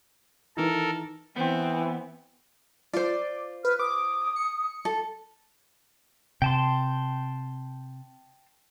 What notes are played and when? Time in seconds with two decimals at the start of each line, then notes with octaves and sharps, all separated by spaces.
0.57 D#3 E3 A4 A#4
1.36 E3 B3 C4
2.93 F4 C5 D5
3.65 B4 F6
3.79 D6 D#6
4.36 C#7
4.85 A4
6.42 C3 G5 A5 C6